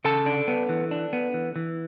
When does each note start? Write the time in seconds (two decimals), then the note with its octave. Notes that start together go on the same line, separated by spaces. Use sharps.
0.05 C#3 A4 A5
0.26 D4
0.48 B3
0.69 E3
0.91 D4
1.13 B3
1.34 E3
1.56 E3